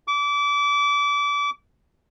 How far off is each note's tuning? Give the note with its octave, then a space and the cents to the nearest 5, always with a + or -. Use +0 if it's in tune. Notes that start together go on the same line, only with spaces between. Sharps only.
D6 -30